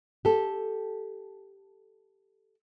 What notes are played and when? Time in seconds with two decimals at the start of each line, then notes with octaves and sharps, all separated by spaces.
0.25 G4 A4